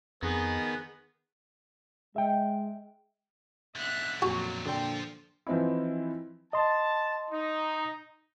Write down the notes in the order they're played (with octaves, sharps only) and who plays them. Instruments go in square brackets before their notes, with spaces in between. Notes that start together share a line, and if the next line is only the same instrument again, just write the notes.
[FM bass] F2 [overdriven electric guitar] D#3 D#4 [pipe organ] B3 [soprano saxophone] G#4
[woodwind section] G#3 [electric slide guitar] E5 G5
[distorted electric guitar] B1 D3 [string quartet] E5 F#6
[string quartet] F2 A#2 F#3 [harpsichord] F#4
[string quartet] A#2 [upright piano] D3 G5 [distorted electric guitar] F3 C6
[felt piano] E3 F3 C4 D#4 E4
[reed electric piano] D#5 C6 [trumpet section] A5
[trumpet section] D#4